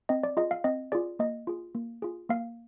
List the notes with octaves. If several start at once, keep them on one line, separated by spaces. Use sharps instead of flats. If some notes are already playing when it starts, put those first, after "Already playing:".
C4 D#5
D5
F4 G#4 D#5
F5
C4 D#5
F4 G#4 D5
A#3 D#5
F4 G#4
A#3
F4 G#4
A#3 F5